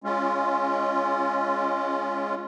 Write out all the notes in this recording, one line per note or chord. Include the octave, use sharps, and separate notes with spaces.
G#3 C#4 F4